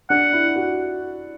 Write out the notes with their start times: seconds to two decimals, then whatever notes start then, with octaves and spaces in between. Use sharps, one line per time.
0.10 D4 F#5
0.33 E4
0.56 F#4